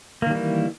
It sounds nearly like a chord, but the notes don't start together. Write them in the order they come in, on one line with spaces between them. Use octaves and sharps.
A#3 D#3 G3 E3